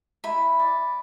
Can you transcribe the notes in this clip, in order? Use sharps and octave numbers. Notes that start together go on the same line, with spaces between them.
E4 B5
D5